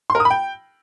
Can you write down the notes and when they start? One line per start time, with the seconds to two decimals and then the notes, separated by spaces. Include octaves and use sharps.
0.10 C6
0.15 A#4
0.20 D#6
0.25 B5
0.30 G5